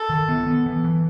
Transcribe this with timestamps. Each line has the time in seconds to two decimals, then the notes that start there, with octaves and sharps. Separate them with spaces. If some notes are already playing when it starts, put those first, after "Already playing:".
Already playing: A4
0.10 D#3
0.29 B3
0.47 B3
0.66 E3
0.84 E3